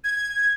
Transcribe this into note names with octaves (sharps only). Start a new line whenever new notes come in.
G#6